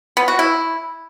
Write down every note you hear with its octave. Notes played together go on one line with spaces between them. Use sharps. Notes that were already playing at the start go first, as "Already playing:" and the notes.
B3
F#4
E4